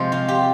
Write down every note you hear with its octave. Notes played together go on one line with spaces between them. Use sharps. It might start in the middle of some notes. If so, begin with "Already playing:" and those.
Already playing: C3 F3 G#3 C5
F4
G4